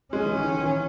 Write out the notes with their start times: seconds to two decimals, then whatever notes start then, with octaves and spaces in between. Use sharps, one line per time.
0.13 G#3 C#4
0.25 E3
0.38 D#3
0.50 D#3
0.63 E3